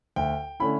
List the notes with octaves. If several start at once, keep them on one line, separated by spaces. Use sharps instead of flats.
D2 G5
D3 A3 C#4 E4 B5